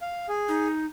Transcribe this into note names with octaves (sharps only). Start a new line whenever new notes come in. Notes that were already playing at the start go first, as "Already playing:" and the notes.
F5
G#4
D#4